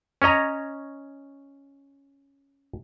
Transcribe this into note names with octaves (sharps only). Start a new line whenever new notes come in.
C#4 C#5 D#5 A#5